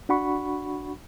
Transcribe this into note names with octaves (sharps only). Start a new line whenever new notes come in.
D4 F#4 F#5 B5 C#6